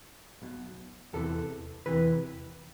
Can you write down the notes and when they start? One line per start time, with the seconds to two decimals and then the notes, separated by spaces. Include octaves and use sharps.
0.42 B1 B2
1.13 E2 C3 E3 A4
1.86 E2 C3 E3 B4